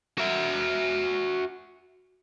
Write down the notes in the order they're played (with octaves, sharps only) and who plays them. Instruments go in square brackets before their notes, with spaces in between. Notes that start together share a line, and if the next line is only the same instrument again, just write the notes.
[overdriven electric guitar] F#4 E5